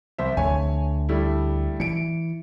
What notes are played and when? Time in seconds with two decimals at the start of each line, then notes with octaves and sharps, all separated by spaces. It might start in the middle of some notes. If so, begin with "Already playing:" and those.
0.18 C2 C5 E5
0.37 D2 D3 C#5 G#5
1.09 G3 A3 E4
1.80 E3 C#7 D7